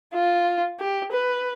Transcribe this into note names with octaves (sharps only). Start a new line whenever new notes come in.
F4
G4
B4